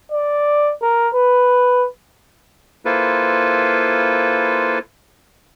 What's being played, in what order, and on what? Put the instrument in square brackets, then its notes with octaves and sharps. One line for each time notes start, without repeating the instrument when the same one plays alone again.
[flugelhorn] D5
A#4
B4
[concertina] A#3 E4 F4 A4 B4 C5